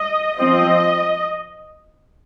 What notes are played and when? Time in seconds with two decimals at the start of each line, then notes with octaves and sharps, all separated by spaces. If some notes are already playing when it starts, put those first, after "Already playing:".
Already playing: D#5
0.38 F3 C4 D#5